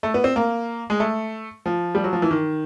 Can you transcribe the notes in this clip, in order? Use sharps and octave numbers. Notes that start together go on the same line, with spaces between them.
A3
B3
C4
A#3
G#3
A3
F3
G3
F#3
F3
E3
D#3